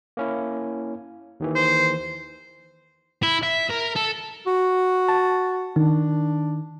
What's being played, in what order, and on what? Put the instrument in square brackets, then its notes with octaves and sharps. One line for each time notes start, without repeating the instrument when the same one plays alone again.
[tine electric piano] A#3 C#4 E4
D#2 D#3 E3
[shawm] C5
[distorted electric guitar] E4
E5
A#4
A4
[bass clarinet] F#4
[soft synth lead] A5
[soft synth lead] D#3 [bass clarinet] D4